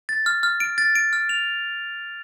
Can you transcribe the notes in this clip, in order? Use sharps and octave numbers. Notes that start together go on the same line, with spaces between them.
A6
F6
F6
D7
A6
D7
F6
F7